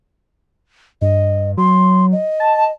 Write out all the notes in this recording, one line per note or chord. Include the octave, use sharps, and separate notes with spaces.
G2 D#5
F#3 C6
D#5
A5